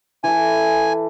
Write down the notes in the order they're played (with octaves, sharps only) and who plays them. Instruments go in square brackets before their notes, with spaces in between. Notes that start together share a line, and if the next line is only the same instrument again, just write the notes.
[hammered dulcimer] E3 A4 [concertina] G#5